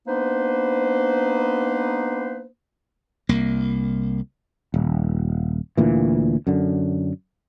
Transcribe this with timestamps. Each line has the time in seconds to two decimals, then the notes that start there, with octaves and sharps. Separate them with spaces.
0.07 A#3 B3 D4 D#4 B4 C5
3.29 C2 A#3
4.74 D#1
5.77 D2 A#2 E3
6.47 F#2 D3